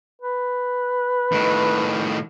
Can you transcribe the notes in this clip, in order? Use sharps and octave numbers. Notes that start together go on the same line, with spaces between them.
B4
A2 D#3